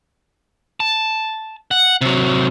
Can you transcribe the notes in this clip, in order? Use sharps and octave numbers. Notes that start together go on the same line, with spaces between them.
A5
F#5
C3 F#3